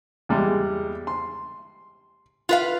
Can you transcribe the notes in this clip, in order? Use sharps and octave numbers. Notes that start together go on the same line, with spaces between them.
E2 G3 G#3
C6
F4 B4 F5